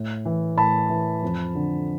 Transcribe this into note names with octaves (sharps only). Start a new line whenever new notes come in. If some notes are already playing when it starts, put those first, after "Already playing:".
Already playing: A2
E3
A2 A5 B5
E3
F2
D3